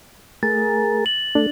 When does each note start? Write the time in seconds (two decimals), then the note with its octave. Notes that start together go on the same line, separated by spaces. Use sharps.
0.43 A3 G#4 A#4 A6
1.06 F#7
1.35 A3 D4